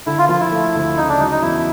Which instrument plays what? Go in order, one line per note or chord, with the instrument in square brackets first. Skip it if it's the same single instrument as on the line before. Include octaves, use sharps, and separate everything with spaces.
[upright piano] D3 [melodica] E4
[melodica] F4
[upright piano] F3 [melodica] F4
[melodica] E4
[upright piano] A3
D2
[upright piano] C#3 [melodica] D#4
[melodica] D4
[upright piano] F#3 [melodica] D#4
[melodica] D#4
[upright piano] E2 [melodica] E4